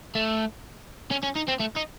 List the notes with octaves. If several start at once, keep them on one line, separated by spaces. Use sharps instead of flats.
A3
C#4
C#4
D#4
C4
A3
D#4